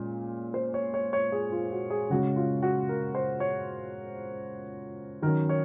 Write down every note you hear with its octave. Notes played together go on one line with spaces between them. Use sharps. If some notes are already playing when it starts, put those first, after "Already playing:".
Already playing: A#2 G#3 C#4
C5
C#5
C#5
C#5
G#4
F4
F#4
G#4
C#3 G#3 C#4 F#4
F4
F#4
A#4
C5
C#5
D#3 F#3 C#4 A#4
C#5